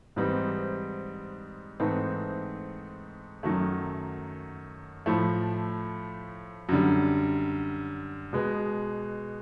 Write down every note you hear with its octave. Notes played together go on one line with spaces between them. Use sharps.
G#2 E3 G3 C4 D#4
G#2 E3 A3 C4 D#4
F#2 D#3 F#3 A3
A2 F3 A3
F#2 D3 G3
B2 G#3 B3